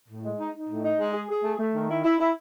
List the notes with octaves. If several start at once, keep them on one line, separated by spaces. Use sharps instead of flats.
A2
G#3
D#4
D#4
A2
D#4
G#3
G#4
G#4
A3
A3
D#3
E4
E4
E4